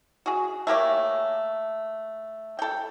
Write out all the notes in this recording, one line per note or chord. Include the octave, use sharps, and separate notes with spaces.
F#4 G#4
A3 A#3 G4 C#5
A4 G5